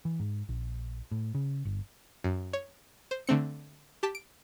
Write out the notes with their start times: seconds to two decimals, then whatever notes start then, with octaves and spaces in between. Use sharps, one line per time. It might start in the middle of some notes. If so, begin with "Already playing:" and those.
0.05 E3
0.20 G#2
0.49 A#1
1.11 A2
1.35 C#3
1.65 G1
2.24 F#2
2.53 C#5
3.11 C5
3.27 D3 A3 C4 C#7
4.03 G4 A5 B6
4.15 D7